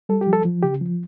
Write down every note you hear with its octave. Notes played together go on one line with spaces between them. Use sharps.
G3 A4
G4
F3
A4
F3
C#3 G4
F3